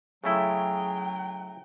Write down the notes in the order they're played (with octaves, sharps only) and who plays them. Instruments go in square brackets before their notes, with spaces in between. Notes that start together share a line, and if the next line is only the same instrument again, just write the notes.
[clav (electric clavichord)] C#3 A3 E4 [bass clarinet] F#3 [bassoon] G#4 [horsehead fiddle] G5